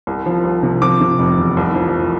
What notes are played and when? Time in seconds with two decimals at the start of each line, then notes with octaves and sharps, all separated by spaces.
0.07 C2
0.26 F3
0.44 C2
0.63 C3
0.81 F3 D6
1.01 C3
1.19 F1
1.38 E2
1.57 C2
1.75 F3